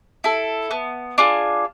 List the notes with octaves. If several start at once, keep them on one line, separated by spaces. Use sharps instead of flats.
E4 A4
B3
D4 F4 G#4